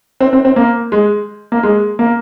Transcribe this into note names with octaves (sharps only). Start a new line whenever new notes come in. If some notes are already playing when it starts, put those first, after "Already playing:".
C4
C4
C4
A#3
G#3
A#3
G#3
A#3